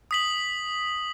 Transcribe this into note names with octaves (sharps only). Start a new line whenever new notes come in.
D#6 B6 F#7